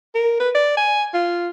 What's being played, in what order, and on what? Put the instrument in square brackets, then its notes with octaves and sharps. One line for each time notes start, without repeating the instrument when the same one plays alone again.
[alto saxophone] A#4
B4
D5
G#5
F4